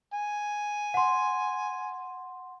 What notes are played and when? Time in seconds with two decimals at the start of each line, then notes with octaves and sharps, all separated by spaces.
0.13 G#5
0.94 F#5 C6